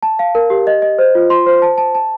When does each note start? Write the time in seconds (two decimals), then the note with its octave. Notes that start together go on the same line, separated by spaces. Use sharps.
0.03 A5
0.19 F5
0.35 A#4
0.50 G4
0.67 D#5
0.82 D#5
0.99 C5
1.15 F4
1.30 C6
1.46 C5
1.62 A5
1.78 A5
1.95 A5